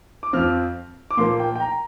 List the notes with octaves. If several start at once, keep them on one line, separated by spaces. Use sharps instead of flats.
D6
F2 F3 C4 F6
D6
A#2 F3 A#3 C6
G5
G5
A#5